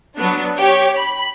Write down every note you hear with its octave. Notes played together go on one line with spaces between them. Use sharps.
F#3 B3 D4
G4 C#5
B5